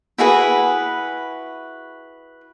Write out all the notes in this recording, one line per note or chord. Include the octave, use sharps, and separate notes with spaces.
E4 F#4 G#4 B4